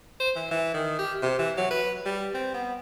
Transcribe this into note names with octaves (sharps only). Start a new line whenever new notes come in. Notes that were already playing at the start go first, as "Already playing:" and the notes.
C5
E3
E3
D#3
G4
C3
E3
F#3
B4
G3
C4
B3